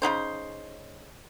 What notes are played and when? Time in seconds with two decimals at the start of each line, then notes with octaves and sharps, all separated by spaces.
0.02 C#3 F#3 D#4 C5